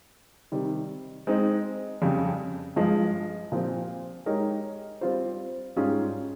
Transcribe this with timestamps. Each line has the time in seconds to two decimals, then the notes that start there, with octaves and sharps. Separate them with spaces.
0.52 C3 D#3 G3
1.27 G#3 C4 D#4
2.02 F2 C#3 G3
2.76 G2 F3 G#3
3.52 A#2 F3 C4 G4
4.26 G#3 D#4 G4 A#4 C#5
5.01 G3 C4 F4 C5
5.76 G#2 G3 C#4 F4 G#4